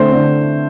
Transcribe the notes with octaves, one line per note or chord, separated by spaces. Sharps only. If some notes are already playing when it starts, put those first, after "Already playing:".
Already playing: D3 A3 C4 C5
D3